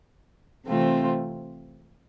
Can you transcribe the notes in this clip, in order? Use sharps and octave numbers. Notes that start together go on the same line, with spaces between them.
C3 E3 A3 C4 F4